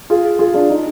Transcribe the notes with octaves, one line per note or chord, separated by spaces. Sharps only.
F4 G#4
F4 G#4
D4 F4
D#4